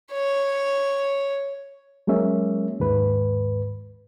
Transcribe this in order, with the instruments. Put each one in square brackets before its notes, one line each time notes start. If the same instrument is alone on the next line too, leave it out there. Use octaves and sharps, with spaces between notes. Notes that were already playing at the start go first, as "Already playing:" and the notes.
[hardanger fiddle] C#5
[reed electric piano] F#3 G#3 A#3 C#4 E5
D#2 G#2 B4